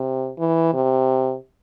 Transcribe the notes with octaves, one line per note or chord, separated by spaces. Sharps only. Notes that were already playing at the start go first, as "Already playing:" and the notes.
Already playing: C3
E3
C3